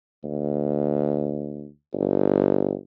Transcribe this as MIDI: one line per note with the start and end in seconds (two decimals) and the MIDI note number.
0.24 1.67 38
1.93 2.74 31